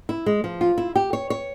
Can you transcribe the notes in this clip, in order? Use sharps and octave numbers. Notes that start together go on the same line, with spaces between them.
E4
G#3
F3
F4
E4
G4
C#5
C#5